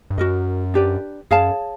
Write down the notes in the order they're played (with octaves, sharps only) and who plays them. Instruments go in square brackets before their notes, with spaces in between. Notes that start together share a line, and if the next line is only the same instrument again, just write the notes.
[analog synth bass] G2
[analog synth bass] F#2 [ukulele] F#4 A#4 D#5
[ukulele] D4 G4 B4 D5
[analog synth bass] F#2 [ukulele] G#4 C#5 F5 A5